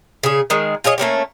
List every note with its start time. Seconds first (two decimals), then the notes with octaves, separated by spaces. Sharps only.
0.23 C#3 G#4
0.50 D#3 G#3 A#3
0.84 F4 G#4 C#5 D#5
0.98 A3 A#3 C#4 G4